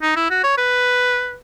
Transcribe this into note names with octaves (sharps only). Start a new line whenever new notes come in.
D#4
E4
F#4
C#5
B4